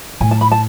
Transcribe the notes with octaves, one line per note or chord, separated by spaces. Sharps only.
A2 G#5
A5
B5
A5